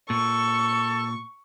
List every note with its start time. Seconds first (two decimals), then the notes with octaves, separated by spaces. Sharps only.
0.10 A#2 A4 C#6